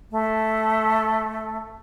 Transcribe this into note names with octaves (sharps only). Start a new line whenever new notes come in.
A3